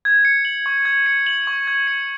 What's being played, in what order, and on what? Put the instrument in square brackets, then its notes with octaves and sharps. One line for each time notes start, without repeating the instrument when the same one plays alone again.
[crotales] G#6
C#7
F#7
C#6
G#6
C#7
F#7
C#6
G#6
C#7